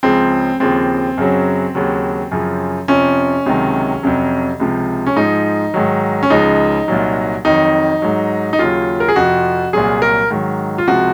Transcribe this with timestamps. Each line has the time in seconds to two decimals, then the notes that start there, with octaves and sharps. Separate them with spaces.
0.03 C#2 C#3 F3 C4
0.60 D#2 C#3 F3 C4
1.18 F#2 C#3 F#3
1.75 D#2 C#3 F#3
2.32 F#2 C#3 F3
2.88 F2 C3 F3 C#4
3.46 C#2 C3 D#3 F#3
4.03 F2 C3 F#3
4.60 C#2 C3 F3
5.06 C#4
5.16 G#2 F3 D#4
5.74 G#2 D#3 F#3
6.23 C#4
6.30 C#2 C#3 F3 D#4
6.88 C2 A#2 F#3
7.45 F2 D#3 F#3 D#4
8.02 G#2 F#3
8.53 D#4
8.59 D#2 C#3 F#3 F4
9.00 A#4
9.08 G#4
9.16 F2 C3 F3 F#4
9.73 C2 A#2 F#3 G#4
10.02 A#4
10.31 G#2 D#3 F#3
10.78 F4
10.88 C#2 C3 F3 F#4